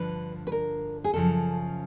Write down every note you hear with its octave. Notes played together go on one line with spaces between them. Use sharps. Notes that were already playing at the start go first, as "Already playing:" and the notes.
Already playing: G2 D3 F3 B4
B4
A#4
G#4
F#2 C#3 F3 A4